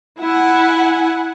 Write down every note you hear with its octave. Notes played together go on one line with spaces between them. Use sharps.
E4 F#5 G#5